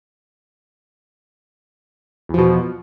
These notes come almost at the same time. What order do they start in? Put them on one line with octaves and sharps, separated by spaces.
E2 F3 B2